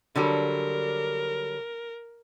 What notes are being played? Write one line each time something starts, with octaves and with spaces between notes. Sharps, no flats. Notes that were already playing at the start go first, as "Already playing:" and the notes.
D3 F#3 G3 A#4